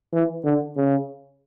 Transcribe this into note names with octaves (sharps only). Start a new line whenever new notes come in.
E3
D3
C#3